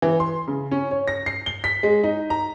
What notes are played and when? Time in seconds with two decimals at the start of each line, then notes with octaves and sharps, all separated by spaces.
0.02 E3
0.20 C6
0.48 C#3
0.71 C#4
0.91 C#5
1.08 A#6
1.26 C7
1.46 G7
1.64 B6
1.83 G#3
2.03 D#4
2.30 A#5